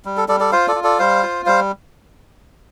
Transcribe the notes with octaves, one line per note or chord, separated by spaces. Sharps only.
G3
A4
G3 A4 D5
A4 D5
F4 C5 F5
A4 D5
F4
A4 D5
G3 C5 F5
F4
G3 C5 F5